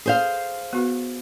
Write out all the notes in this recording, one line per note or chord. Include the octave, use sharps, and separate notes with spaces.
G#4 C5 F5
B3 F#4 B4